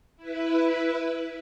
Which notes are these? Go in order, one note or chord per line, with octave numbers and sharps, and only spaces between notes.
E4 B4